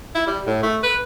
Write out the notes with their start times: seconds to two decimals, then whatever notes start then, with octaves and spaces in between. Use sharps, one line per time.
0.15 E4
0.27 G3
0.47 A2
0.63 A3
0.83 B4